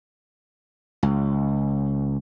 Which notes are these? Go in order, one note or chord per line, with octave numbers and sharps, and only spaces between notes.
C#2